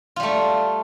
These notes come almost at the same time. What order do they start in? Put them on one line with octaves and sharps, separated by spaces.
F4 G3 A3